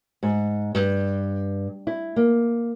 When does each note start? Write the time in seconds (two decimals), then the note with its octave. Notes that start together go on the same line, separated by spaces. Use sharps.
0.23 G#2
0.75 G2
1.87 E4
2.16 A#3